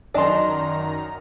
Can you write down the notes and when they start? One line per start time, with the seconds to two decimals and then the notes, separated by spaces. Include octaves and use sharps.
0.14 F#2 D#3 D4 D5 D#5 A5 A#5 C6